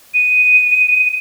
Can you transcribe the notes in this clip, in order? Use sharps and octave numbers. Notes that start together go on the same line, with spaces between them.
D#7